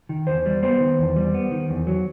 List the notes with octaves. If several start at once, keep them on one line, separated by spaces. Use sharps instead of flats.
D#3
E2 C5
G3
B3 C5
D#3
E2
G3
B3
D#3
E2
F#3